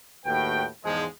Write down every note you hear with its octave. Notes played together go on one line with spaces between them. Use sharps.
D#2 A2 F#4 B4 G5
E2 G#2 F3 G#3